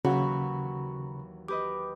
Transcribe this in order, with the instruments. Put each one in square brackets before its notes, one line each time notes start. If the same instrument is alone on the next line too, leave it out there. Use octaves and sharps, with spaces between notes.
[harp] D#2 E3 F#3 [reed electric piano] C#3 [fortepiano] F#4 [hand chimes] A#5 B5 C#6
[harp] G4 B4 D#5 [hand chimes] D6